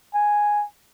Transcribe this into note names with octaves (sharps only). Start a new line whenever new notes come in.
G#5